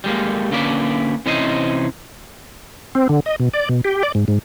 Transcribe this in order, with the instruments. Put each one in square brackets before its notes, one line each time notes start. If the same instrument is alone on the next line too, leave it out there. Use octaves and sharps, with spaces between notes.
[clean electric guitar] G3 G#3 A#3
D3 A#3 C#4 B4 D5
C3 E3 C#4 D#4 C5 D#5
[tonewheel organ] C4
D3
D#5
B2
D5
B2
G4
D5
G#2
G#2